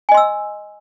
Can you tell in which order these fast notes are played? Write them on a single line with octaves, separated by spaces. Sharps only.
G#5 D#5 C6 E6